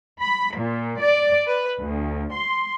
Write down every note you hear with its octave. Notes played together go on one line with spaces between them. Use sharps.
B5
A#2
D5
B4
D2
C6